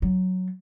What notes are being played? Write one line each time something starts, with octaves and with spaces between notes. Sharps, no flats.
F#3